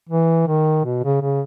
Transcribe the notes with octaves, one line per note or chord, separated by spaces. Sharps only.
E3
D#3
B2
C#3
C#3